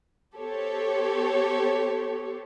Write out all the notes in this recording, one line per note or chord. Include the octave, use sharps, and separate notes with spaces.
B3 G4 A4 C5 C#5